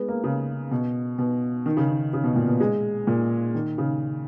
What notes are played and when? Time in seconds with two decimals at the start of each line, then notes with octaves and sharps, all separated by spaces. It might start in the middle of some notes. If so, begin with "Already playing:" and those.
Already playing: G#3 B3
0.08 A#3
0.24 C#3
0.71 B2
1.18 B2
1.66 D#3
1.77 C#3
1.88 D#3
2.13 C#3
2.24 B2
2.36 A#2
2.47 B2
2.60 G#3
3.07 A#2
3.55 D#3
3.78 C#3